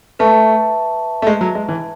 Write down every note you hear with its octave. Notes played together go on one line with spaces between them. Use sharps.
A3 B4 E5 A5 C#6
A3
G#3
F#3
G#3
E3